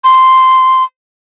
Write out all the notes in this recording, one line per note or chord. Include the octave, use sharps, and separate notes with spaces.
C6